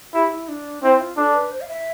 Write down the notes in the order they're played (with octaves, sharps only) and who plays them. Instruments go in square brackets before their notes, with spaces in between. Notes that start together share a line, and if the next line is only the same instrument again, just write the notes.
[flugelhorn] E4 [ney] G4
[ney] E4
D4
[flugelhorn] C4 [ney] E4
[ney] F4
[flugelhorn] D4 [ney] A4
[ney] B4
C5
F5
E5